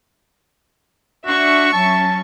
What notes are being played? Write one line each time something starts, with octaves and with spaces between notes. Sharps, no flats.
D4 F#4 E5 C#6
F#3 C#4 A5